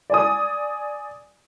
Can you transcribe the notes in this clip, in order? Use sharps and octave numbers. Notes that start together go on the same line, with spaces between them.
D5 G#5 D#6